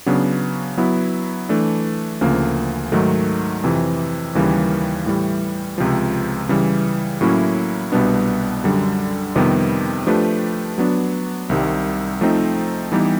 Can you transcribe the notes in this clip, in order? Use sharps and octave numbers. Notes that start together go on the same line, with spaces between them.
C#3 F#3 B3 D4
F#3 B3 E4
E3 A3 D4
D2 C#3 F3 A#3
G#2 D#3 F#3 A3
F2 C3 E3
D#2 C#3 E3 G3 A#3
A2 E3 G3
C#2 C3 F3
C#3 E3 G3
A2 F#3 A#3 C#4 E4
C2 B2 G3 B3 D4
F#2 D3 G3
F2 C3 D#3 G3 B3
F3 A3 D4 G4 B4
F#3 B3 D4
C2 C3 D#3 G3
F3 A3 C4 D#4
E3 G3 B3 D#4 G4